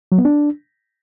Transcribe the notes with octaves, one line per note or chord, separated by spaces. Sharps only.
F#3
B3
D4